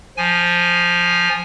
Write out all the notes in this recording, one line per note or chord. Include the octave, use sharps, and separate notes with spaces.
F3 G#5